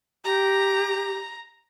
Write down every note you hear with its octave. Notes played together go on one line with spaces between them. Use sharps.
G4 A#5